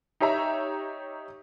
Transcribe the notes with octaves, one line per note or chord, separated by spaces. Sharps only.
D#4 G4 C#5 E5 A#5